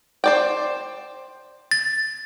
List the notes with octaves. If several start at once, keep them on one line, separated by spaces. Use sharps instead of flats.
C5 D5 G5
A6